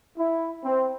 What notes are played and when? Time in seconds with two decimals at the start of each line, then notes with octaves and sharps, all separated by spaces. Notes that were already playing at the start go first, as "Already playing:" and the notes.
0.16 E4
0.64 C4